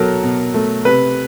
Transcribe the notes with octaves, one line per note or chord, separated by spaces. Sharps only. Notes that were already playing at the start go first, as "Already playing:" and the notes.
Already playing: B2 F#3 A4 A#4
B2
A3
C3 B4